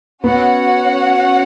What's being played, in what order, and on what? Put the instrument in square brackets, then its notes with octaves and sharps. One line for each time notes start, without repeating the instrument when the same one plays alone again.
[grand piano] B3 [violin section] C#4 F#4 C#5 F#5